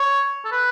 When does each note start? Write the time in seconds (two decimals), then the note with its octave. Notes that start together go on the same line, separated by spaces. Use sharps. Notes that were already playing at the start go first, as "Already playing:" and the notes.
Already playing: C#5
0.45 A4
0.52 B4